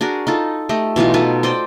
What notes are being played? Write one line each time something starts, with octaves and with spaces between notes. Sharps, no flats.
D4 F#4 G#4 A#4
D#4 F4 A4
A3 G4 D#5
B2 E3 D#4 F4
D#4 F4 A4 B4
C5 D5 D#5 G5